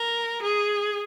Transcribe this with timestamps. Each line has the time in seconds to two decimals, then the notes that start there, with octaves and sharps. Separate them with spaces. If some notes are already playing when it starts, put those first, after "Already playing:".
Already playing: A#4
0.42 G#4